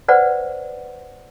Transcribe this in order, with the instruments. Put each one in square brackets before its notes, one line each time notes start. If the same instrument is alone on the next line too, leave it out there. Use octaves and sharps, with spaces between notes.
[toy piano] B4 C5 D5 F#5